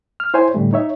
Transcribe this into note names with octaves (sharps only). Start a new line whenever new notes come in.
F6
E4 C5 C#5 G#5
A2 D3 G3 A3
D#4 C#5 E5